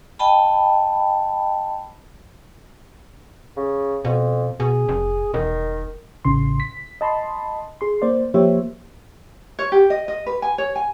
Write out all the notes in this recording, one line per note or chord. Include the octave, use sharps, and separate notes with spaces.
D#5 G5 A5 B5
C#3
F2 B2
B2 G#4
F1
E1 D#3
A1 C#3 C6
B6
D#5 A5 B5 C6
G#4 C6
A#3 C5 D5
F3 A#3 G4 C5 C#5 E5
C#5
G4
D#5
D#5
B4
G#5
C#5
G#5